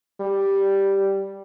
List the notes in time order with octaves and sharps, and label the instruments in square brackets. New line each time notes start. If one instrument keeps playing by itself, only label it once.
[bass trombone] G3